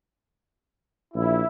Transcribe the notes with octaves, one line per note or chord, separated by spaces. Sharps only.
A#1 E4